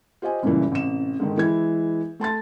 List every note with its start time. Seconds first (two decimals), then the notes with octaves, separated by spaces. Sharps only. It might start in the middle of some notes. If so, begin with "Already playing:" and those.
0.22 F4 G4 C5 D#5 G#5
0.43 F#1 C#2 G2 A#2 E3
0.72 A1 C3 E7
1.20 G#2 D3 D#3
1.37 E3 G#3 E4 G#6
2.20 A3 A5 C6 A6